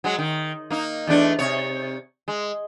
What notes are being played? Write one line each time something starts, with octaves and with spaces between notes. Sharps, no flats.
F#3 G#3
D#3
A#3 D#4
E2 A3 D4
C3 C#5
G#3